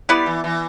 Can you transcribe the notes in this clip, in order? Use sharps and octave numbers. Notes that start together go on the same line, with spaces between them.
G3 B3 E4 B4 D5
E3
E3